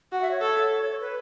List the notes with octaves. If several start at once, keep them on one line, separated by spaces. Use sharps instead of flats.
F#4 F#5
E5
C#5
A4
C#5
B4